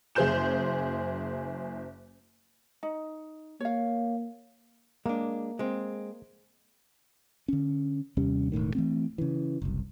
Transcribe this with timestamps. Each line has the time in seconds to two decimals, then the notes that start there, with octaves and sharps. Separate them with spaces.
0.15 F#1 G#4 C5 C6 G6 E7
2.83 D#4
3.61 A#3 C#5 F5
5.06 G#3 A#3 D4
5.59 G#3 C4
7.48 D3 C#4
8.17 D#2 C3 G3 C#4
8.52 E1 A#1 A2 D#3
8.75 E3 A3 C4
9.18 C#3 E3
9.62 F#1 C2